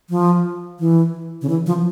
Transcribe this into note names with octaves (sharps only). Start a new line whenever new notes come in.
F3
E3
C#3
E3
F3